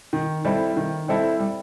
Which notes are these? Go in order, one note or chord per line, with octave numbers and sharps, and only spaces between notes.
D#3
G3 C4 E4 A4
D#3
G3 C4 E4 A4
G3